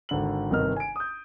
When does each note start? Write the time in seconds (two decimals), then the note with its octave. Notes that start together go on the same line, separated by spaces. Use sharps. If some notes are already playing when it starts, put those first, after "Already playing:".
0.09 G#1 D3 F#7
0.51 G1 C3 D#3 D#5 F6
0.76 G#5 D7
0.96 D#6 G6